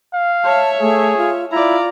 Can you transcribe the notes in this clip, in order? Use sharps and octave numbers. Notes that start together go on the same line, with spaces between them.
F5
C#5 E5 A5
A3 G#4
F4
E4 F4 D5 A#5